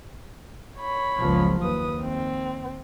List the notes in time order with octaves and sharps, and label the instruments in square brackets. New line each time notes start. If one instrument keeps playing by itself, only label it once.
[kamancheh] C#5 B5
[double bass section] F#1 C#2 F3
[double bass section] D#2 [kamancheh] B4 D#6
[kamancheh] C4